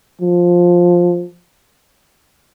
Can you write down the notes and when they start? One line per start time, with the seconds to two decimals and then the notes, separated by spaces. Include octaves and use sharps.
0.22 F3